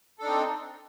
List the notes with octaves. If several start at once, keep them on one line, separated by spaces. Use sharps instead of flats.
C4 D4 D#4 A4